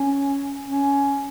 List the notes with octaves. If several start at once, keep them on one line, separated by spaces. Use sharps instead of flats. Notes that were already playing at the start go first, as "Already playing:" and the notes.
Already playing: C#4
C#4